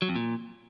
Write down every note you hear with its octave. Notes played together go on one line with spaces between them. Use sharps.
F#3
F2
A#2